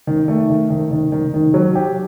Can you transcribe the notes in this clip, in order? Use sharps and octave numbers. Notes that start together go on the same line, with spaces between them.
D#3
A3
D#3
D#3
D#3
D#3
D#3
F#3
G4